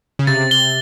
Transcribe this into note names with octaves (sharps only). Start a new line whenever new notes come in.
C#3
C3 A6
G7